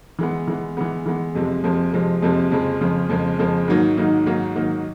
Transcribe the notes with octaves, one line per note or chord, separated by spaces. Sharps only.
E3 G#3 B3
E3 G#3 B3
E3 G#3 B3
E3 G#3 B3
F2 C3 F3 G#3
F2 C3 F3 G#3
F2 C3 F3 G#3
F2 C3 F3 G#3
F2 C#3 F3 G#3
F2 C#3 F3 G#3
F2 C#3 F3 G#3
F2 C#3 F3 G#3
G#2 D#3 F#3 A#3 D#4
G#2 D#3 F#3 A#3 D#4
G#2 D#3 F#3 A#3 D#4
G#2 D#3 F#3 A#3 D#4